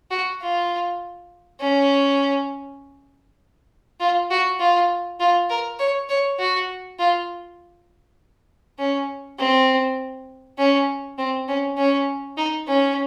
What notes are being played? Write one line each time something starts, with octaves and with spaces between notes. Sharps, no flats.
F#4
F4
C#4
F4
F#4
F4
F4
A#4
C#5
C#5
F#4
F4
C#4
C4
C#4
C4
C#4
C#4
D#4
C#4